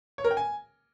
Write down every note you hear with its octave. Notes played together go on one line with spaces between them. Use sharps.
C#5
A#4
G5
G#5